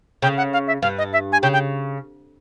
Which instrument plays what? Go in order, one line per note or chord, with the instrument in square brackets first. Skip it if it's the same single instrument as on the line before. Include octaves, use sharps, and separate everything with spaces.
[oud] C#3 [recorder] G5
[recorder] F#5
F5
E5
[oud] G2 [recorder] F5
[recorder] D#5
E5
G#5
[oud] C#3 [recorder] G5
[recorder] G5